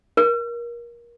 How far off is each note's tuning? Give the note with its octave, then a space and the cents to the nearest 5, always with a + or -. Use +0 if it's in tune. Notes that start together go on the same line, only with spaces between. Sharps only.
A#4 +25